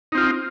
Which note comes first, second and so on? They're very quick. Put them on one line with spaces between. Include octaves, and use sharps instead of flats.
D#4 C4 F4